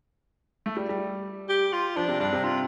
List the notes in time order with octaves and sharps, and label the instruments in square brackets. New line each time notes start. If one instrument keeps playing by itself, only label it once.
[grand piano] A3
G3
G3
[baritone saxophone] G4
F4
[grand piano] F3 [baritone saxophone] D4
[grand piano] C3
[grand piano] G2 [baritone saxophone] D4
[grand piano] C3
[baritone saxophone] F4